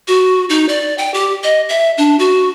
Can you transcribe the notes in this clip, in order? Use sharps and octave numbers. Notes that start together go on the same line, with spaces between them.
F#4
D#4
D5
G5
G4
D#5
E5
D4
F#4